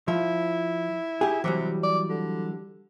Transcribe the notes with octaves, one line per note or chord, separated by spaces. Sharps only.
F3 E4
G4 G#4
C3 E3 F#3 G3
D5
D3